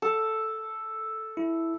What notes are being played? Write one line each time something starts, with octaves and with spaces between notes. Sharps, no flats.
A4
E4